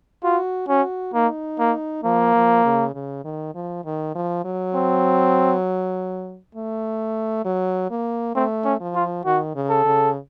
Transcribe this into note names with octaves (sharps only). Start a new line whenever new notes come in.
F4 F#4
C#4 F#4
A#3 D#4
A#3
F3 A#3
F3
C#3
C#3
D#3
F3
D#3
F3
F#3
C4
A3
F#3
A#3
A3 C4
C#4
F3
F4
D#3 F#4
C#3
A4
C#3